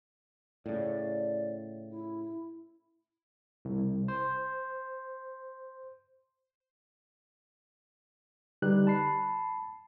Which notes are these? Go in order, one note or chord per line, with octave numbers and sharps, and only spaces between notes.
A2 C#3 D5
E4
C2
C5
D3 G3 D#4 G4 B4 F#6
A5 B5 C7